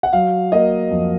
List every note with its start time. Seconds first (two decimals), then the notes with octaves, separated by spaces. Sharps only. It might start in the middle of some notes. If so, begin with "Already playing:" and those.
0.03 F#5
0.13 F#3 F5
0.52 A#3 D#5
0.91 F2